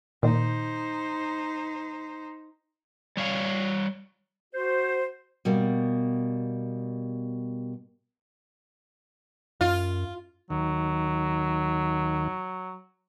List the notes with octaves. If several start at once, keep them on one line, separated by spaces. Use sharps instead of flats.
A#2 D#3 D#4 C5
G3 C#5 F5
F#4 C5
B2 G3 A#3
F#2 F4
D#2 D#3 F#3